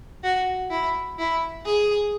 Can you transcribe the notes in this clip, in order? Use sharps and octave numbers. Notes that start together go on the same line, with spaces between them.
F#4
E4
E4
G#4